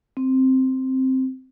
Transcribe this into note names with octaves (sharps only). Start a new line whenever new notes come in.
C4